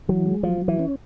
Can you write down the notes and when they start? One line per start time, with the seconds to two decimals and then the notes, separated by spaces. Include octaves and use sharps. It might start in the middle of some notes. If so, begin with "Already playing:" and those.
0.09 E3 F#3
0.26 G#3
0.43 F3 F#3
0.62 F#3
0.68 E3
0.79 C#4